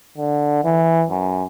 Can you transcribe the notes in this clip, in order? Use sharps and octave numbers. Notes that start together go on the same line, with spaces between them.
D3
E3
F#2